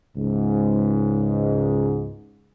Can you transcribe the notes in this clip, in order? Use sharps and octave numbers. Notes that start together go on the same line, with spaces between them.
C#2 G#2